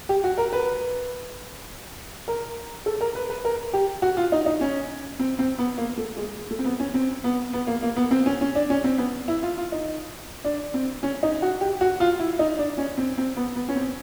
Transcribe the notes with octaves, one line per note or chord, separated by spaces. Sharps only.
G4
F#4
A#4
B4
A#4
A4
A#4
B4
B4
A#4
G4
F#4
F4
D#4
D#4
C#4
C4
C4
B3
A#3
A3
G#3
A3
C4
B3
C#4
C4
B3
B3
A#3
A#3
B3
C4
C#4
C#4
D4
C#4
C4
B3
E4
F4
F4
D#4
D4
C4
C#4
D#4
F#4
G4
F#4
F4
E4
D#4
D4
C#4
C4
C4
B3
B3
C#4
C4